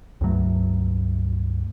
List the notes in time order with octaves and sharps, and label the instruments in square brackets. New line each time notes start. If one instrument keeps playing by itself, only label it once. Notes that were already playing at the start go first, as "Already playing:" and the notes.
[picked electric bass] C#2 G2 F#3 A3